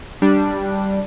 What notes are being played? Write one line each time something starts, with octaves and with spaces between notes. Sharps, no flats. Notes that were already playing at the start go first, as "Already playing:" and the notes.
G3 D4